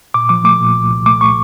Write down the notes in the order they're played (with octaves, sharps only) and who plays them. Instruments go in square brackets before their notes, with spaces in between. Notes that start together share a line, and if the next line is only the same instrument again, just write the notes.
[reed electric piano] A#2 D6
F3 D6
A3 D6
A#2
C2
C2
A3 D6
A3 C#6